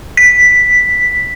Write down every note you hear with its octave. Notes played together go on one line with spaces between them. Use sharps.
B6